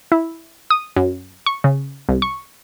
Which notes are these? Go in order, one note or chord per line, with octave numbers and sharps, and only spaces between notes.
E4
D#6
F#2
C#6
C#3
C2
C#6